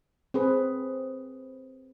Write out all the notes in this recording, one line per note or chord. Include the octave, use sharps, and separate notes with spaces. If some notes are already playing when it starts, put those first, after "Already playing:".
C4 G#4 B4